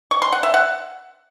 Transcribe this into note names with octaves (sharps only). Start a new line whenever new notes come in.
C#6
C6
F#5
E5
F#5